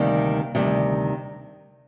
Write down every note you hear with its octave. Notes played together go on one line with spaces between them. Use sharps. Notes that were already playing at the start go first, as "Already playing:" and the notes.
Already playing: D2 C3 D#3 G3 A#3
D2 C3 D#3 G3